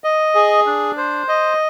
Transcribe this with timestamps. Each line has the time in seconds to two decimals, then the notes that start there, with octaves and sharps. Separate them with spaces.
0.04 D#5
0.35 G#4
0.67 D4
0.97 C5
1.28 D#5